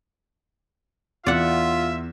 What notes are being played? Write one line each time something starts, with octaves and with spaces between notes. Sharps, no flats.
E2 F4 D5 E5 F#5